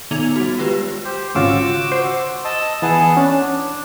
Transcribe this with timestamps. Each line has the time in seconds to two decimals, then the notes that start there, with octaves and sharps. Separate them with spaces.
0.11 D#3 B3 D#4 G#6 F7
0.36 G3 F#4
0.58 G#3 F4 G4 B4
1.05 G4 C5
1.35 G#1 C#3 F4 F#4 D6 E6
1.92 C5
2.45 D#5 A5 E6
2.82 E3 B3 G#4 A5
3.17 C#4 D4